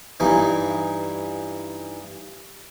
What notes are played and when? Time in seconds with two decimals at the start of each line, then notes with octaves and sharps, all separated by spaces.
0.20 G2 E3 D#4